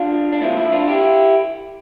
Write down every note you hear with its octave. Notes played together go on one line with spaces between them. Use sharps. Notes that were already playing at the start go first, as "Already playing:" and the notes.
Already playing: D4 F4
D4
A#2 F3 C4 E4
E4
D4 F4
E4 G4